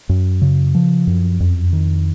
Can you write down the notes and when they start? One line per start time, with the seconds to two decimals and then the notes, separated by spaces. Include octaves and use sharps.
0.09 F#2
0.42 C#3
0.75 F3
1.07 F#2
1.40 F2
1.73 D#3